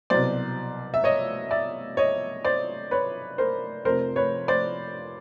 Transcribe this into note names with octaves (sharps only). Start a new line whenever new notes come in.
C2 B2 F#3 C5 D5
E5
C#5 D#5
D5 E5
C#5 D#5
C5 D5
B4 C#5
A#4 C5
F1 F2 C3 A#4 C5
B4 C#5
C5 D5